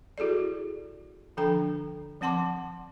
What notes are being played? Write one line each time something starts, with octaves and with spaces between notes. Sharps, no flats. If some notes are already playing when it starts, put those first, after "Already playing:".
E4 F#4 G#4 A4 D5
D3 F3 D4 A4 G5 A#5
F3 C4 F#5 A5 C6 D6